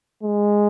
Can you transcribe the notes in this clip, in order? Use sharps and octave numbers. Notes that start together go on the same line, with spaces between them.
G#3